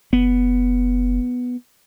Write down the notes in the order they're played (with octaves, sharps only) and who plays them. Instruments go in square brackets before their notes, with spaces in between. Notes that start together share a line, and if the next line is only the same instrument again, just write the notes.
[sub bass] F#1 [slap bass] B3